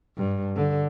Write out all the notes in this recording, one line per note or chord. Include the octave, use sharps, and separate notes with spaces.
G2
D3